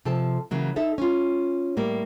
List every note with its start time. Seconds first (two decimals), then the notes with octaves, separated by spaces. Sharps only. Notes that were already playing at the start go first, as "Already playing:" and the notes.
0.05 C3 F3 A4 A5
0.51 C#3 E3 F#3 A#3
0.76 D#4 A4 E5
0.98 C#4 F4
1.77 A2 G3 A#3